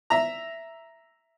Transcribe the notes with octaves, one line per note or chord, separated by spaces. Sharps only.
E5 A#5